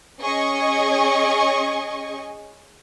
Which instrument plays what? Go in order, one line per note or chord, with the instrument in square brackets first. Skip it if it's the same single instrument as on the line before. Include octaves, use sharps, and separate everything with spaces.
[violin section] C#4 G#4 D#5 G#5 C#6